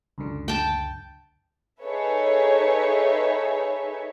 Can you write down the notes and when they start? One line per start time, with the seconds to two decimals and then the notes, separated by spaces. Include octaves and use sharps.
0.18 C#2 F#2 D3
0.48 G5 A5
1.82 D#4 G#4 A4 B4 C#5 E5